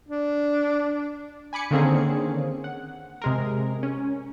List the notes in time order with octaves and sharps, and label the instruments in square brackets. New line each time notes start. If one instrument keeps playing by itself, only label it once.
[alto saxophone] D4
[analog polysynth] G#5 B5 D6 C#7
D3 D#3 A#3 C4 C#4 G#4
F#5
C3 G#3 A#4
C#4